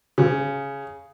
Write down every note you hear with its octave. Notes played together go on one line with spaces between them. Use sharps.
C#3